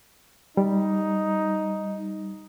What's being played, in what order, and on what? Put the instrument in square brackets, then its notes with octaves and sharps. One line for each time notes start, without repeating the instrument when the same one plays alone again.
[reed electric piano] G3 [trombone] D#4